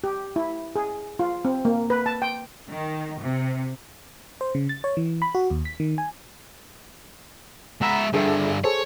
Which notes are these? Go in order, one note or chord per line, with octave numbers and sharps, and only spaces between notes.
G4
E4
G#4
F4
C4
A#3
B4
A5
G5
D#3
C3
C5
C#3
A6
C#5
E3
B5
F#4
D#2
B6
D#3
G#5
G#3 E5 F#5 A#5 B5
G2 D3 G#4 A4 E5
G#4 A4 C5 C#5